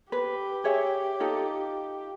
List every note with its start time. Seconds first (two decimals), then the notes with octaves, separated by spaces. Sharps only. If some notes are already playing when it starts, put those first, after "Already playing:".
0.12 G4 B4
0.64 G#4 C#5 E5
1.20 D#4 F4 A4